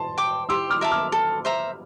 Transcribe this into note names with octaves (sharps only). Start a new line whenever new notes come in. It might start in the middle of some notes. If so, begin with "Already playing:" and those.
Already playing: A5 C6
G5 D6
G4 C6 E6
D6 F6
A#4 E5 A5
D6 F6
A4
C5 E5 A#5